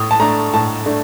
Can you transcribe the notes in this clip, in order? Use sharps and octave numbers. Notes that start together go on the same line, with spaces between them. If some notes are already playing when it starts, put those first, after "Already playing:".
Already playing: A2 D#6
A5
A3 D4 A#5
A2 A5
A3 D4